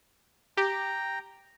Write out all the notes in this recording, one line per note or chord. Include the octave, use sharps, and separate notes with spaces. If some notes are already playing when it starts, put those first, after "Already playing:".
G4 G5 A#5